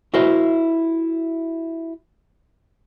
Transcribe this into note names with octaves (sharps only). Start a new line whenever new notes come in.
E4 F#4 A#4 C5 D#5 E5